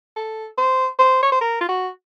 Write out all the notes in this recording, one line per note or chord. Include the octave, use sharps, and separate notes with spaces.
A4
C5
C5
C#5
C5
A#4
F4
F#4